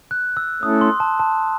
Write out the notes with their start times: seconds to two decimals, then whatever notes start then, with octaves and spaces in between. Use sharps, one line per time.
0.11 F#6
0.37 E6
0.62 A3 C#4 E4 A4 D#6
0.81 C6
1.00 A5
1.20 A5